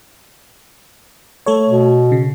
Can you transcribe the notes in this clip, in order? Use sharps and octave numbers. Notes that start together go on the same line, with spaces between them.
A3 A4 C#5
B2
C#3